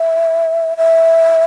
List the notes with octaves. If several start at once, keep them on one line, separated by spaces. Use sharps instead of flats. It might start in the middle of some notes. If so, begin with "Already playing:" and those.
Already playing: E5
E5